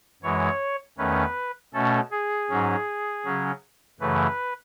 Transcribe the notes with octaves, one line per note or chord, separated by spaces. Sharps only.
F#2 E3 G#3 C#5
E2 D#3 A3 C#4 B4
B2 A3 C#4 A4
G#4
G#2 F#3 C#4
C#3 F#3 C#4
F#2 C#3 E3 A3 B4